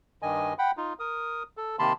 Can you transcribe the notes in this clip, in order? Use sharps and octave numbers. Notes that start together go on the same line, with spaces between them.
G2 D#3 D#5 G#5
F#5 G5 B5
D#4 F4
A#4 D#6
A4
C3 D#3 A#3 A5 B5 C6